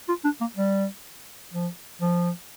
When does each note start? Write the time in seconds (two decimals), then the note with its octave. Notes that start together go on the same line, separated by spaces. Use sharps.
0.08 F4
0.24 D4
0.41 A#3
0.56 G3
1.53 F3
2.01 F3